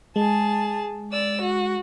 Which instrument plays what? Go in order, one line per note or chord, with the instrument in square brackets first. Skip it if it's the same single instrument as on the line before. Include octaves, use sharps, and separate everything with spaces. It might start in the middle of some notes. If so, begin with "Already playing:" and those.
[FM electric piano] G#3 [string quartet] G#4 A5
[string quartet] D5 E6
F#4